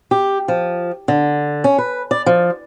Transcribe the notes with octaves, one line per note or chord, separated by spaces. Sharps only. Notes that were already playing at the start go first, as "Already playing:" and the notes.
G4
F3
D3
C#4
B4
D5
F3